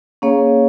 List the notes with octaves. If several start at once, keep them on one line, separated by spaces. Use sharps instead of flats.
A#3 C#4 G#4 C#5 F5